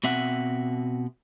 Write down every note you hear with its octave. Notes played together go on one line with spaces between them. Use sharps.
B2 C4 E5 F#5